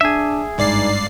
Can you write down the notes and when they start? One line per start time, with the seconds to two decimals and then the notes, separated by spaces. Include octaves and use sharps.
0.01 D4 G#4 E5
0.58 G#1 G2 D#4 D5 C7